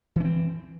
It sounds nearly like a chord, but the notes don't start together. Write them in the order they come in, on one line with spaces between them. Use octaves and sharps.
E3 C#4 C4